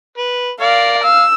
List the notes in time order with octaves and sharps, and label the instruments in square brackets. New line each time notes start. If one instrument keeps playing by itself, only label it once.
[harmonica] B4
[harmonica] A#4 D5 [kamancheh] F5
[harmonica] F5 [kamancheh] E6